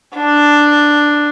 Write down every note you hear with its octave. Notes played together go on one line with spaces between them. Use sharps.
D4